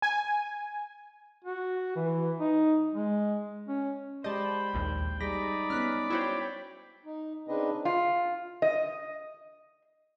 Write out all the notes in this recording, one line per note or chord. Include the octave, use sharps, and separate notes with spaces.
G#5
F#4
E3
D#4
G#3
C#4
G#3 G4 C5 D5 D#5 G5 A5 B5
A#1 D#2
G3 D#4 G#4 D5 B5 A#6
B3 C#4 F6 F#6 B6
E4 F#4 C5 C#5 G5
D#4
C#3 C4 D4 D#4 B4 D#5
F4
D#5